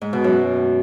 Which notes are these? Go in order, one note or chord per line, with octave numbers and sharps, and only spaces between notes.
G#2
B2
F#2